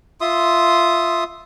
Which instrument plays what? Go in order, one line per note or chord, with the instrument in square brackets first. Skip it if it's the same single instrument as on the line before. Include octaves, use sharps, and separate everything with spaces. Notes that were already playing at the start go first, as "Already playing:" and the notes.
[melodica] F4 E5 C6 D#6